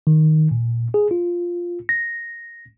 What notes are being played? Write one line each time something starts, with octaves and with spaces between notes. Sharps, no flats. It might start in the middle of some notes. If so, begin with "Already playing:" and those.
D#3
A#2
G#4
F4
A#6